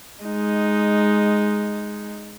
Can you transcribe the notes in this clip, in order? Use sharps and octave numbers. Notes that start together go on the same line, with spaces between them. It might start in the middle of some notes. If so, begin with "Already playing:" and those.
G#3 D#4